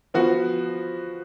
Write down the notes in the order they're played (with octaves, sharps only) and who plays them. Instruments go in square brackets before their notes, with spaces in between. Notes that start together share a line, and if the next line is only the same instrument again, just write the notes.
[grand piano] F3 B3 F#4